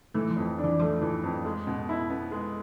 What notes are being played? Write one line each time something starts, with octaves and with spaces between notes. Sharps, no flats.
E3 A3
F3
F2
D4
E3
F3 A3
E3
F2
G#3
B2
E4
B3
G#3